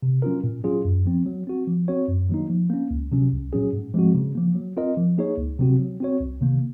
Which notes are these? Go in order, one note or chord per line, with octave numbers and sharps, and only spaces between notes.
C3
F#3 C#4 F4 A#4
A#2
F#3 C#4 F4 G#4
F#2
F3 C4
F#3
C4 F#4
F3
C4 F#4 C#5
F#2
D#3 F#3 A#3 D#4
F3
A#3 C#4
C#2
C3 F#3 C#4
C2
A#2 F#3 C#4 G#4
G#2
F3 G#3 C4 F#4
C#3
F3 A#3
F#3
C4 F4 A#4 D#5
F3
A#3 D#4 G#4 C#5
C#2
C3 F#3 C4 F#4
F#3
C4 F#4 C#5
C2
C3 D#3 A#3